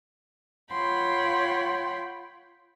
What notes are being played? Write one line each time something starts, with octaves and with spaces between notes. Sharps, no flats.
F4 C#5 F#5 G5 B5 C6